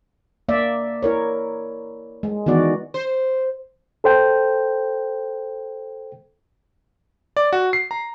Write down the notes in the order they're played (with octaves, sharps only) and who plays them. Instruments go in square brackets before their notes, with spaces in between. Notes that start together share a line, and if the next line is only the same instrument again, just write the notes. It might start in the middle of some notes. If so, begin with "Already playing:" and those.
[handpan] A#3 D5 E5
E4 A#4 C#5
G#3
D#3 E3 B3 F#4 D5
[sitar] C5
[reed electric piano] A4 C5 G5
[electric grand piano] D5
F#4
C7
A#5